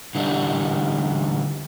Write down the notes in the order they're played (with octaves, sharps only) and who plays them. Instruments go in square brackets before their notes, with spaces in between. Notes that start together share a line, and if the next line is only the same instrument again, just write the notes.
[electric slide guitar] D3 E3 G3 D4 E4